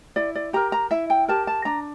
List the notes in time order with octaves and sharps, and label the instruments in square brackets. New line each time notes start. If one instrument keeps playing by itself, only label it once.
[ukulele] E4 D5
D5
G4 A#4 A#5
A#5
E4 E5
G5
G4 A#4 A5
A5
D4 A#5